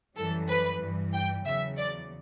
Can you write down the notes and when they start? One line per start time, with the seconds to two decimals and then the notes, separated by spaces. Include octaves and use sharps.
0.16 F#2 E3 G3 A4
0.48 B4
0.81 G2 E3 G3
1.13 G5
1.45 E2 C#3 F#3 E5
1.77 D5